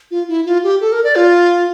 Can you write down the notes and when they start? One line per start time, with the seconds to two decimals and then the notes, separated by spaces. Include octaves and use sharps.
0.11 F4
0.29 E4
0.46 F4
0.64 G4
0.81 A4
0.92 A#4
1.04 D5
1.16 F4